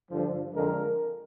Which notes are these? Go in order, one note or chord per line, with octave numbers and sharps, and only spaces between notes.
G2 D3 F3
F2 D3 F3 G#3 A#4